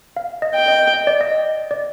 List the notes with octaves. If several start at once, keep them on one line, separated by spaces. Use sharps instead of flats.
F5
D#5
G5
D#5
D#5
D5
D#5
D5